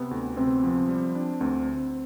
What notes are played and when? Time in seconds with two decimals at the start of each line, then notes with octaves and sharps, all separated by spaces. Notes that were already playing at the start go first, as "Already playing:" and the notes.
Already playing: C3 B3
0.11 D2
0.37 C3 C4
0.64 F3
0.89 G3
1.15 D4
1.40 D2 C4